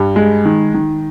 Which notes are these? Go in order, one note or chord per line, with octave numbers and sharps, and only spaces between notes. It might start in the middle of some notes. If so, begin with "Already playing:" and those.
Already playing: G2
G#3
D#3
D#3